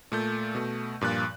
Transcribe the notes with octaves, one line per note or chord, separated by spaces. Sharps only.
A#2 A3 G6
B2 A3
G2 A#2 F3 F#6